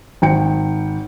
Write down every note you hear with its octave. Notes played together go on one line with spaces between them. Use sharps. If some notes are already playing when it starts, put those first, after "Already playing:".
G#1 G5 C#7